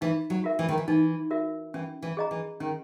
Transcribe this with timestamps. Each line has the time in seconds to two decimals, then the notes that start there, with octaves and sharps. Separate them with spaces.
0.01 E3 D#4
0.30 F#3
0.44 F#4 A#4 E5
0.59 E3
0.69 D#3
0.78 E3
0.88 E3 D#4
1.31 F#4 A#4 E5
1.74 E3 C#4
2.02 E3
2.17 G#4 D#5 A#5
2.31 E3
2.60 D#3 C#4